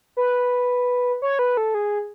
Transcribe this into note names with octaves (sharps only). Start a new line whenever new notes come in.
B4
C#5
B4
A4
G#4